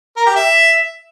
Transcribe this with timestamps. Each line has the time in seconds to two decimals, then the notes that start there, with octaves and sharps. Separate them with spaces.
0.16 A#4
0.26 G4
0.36 E5